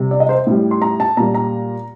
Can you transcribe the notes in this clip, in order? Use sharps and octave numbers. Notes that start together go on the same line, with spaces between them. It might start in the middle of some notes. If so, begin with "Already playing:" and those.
Already playing: C3 G3
D5
D#5
C5
A2 G3
C6
A#5
A5
A#2 G3 A#5
A#5